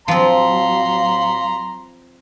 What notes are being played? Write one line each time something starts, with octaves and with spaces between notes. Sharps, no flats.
F3 F#3 C4 F5 A#5 C6